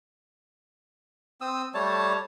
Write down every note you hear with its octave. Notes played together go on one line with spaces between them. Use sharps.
C4 D#6 E6
G3 A3 C#5 A5